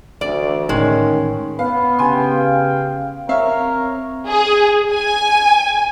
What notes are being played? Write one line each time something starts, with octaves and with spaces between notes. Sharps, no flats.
D2 E3 D5
A2 D3 D#3 G#3 C#4
B3 B4 F5
C#3 G4 G5 G#5 C6
F5
C4 A#4 C#5 E5 F5
G#4
G#5